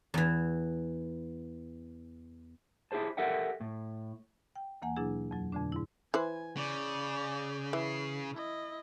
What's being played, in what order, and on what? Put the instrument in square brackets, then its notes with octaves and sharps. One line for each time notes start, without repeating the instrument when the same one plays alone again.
[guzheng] E2 E3
[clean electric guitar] E4 G4 G#4 C5 A5
G4 A4 A#4 E5 F#5 G5
A2
[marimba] G5
D#2 E3 A#3 F#5 G#5
B2 F#3 D4 E4 G#4
F2 F#3
F2 B2 D3 A3 D4
G#2 E4
[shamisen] E3 B4 C5 [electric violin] G#5
[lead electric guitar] C#3 [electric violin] D5 G6
[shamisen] E3 [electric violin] C7
[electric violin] E4 D#5